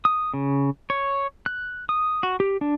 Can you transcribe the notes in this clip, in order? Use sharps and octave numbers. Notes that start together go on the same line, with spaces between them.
D#6
C#3
C#5
F#6
D#6
F#4
G4
D4